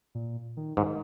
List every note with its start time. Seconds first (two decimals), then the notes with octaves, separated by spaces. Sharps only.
0.15 A#2
0.57 D#3
0.77 G#2 D#3